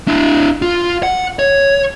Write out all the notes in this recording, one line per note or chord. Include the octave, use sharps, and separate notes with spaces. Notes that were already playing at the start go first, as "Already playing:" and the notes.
D4 E4
F4
F#5
C#5